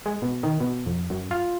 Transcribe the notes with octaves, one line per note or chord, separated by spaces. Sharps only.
G#3
B2
D#3
B2
F2
F#2
F4